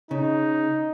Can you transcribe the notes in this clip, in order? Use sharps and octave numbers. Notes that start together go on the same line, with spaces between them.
C#3 D#4